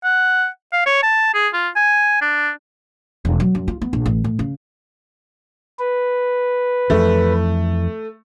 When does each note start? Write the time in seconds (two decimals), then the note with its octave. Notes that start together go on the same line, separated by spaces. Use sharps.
0.04 F#5
0.73 F5
0.86 C#5
1.03 A5
1.34 G#4
1.54 F4
1.76 G#5
2.21 D4
3.25 E1
3.40 F#3
3.55 F#2
3.68 F4
3.82 B3
3.93 A#1
4.06 A1
4.24 A2
4.39 C#3
5.79 B4
6.90 F2 E3 A3